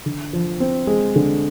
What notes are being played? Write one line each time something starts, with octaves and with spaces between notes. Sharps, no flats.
D3
F3
C4
G#3
D3